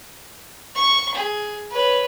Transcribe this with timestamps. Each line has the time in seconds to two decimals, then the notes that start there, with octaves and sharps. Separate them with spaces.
0.75 C#6
1.15 G#4
1.71 B4 C#5